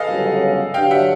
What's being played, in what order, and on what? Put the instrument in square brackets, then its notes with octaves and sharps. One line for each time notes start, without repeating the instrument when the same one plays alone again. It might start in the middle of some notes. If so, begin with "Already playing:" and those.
Already playing: [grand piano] G#4 A4 B4 D#5 F5
[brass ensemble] G1 F#2 C#3 F#3
[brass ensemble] G2 D3 F#3 [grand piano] F5 G5
[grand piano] E5 F#5